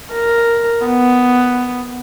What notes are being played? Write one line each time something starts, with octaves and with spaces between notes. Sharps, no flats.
A#4
B3